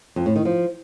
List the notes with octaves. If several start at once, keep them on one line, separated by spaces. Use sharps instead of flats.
F2
A2
D#3
F3